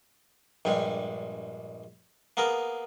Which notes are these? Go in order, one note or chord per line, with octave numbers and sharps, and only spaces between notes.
A#1 G2 G3 G#3
A#3 B3 G#4 A#4